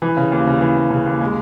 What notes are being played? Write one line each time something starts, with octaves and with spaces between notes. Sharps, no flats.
E3
C#3
D#2
C#3
E3
D#2
C#3
D#2
G#3